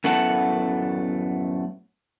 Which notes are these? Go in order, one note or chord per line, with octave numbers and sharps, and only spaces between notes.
F#2 A2 A3 B3 F#5 A5